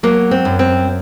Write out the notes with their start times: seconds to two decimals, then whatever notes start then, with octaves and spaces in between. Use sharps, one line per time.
0.03 F#3 A#3
0.31 C4
0.45 F#2
0.59 C4